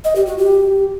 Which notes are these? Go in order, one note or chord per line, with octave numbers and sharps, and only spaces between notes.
D#5
G4
F#4
G4